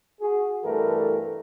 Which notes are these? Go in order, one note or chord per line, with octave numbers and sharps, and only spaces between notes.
F#4 G#4
G2 B2 E3 A3 A4 A#4